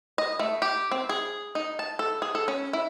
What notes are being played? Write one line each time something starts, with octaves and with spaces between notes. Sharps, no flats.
D#5
A3
G4
C4
G#4
D#4
A5
A4
G#4
A4
C#4
E4